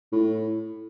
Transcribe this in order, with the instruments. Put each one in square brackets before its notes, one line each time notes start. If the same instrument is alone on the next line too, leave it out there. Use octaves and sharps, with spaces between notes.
[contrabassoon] A2